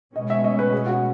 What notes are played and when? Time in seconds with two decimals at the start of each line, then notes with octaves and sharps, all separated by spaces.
0.16 B2 G#3 C#4 D#5
0.30 E5
0.44 D#5
0.59 B4
0.72 G#4
0.87 F#4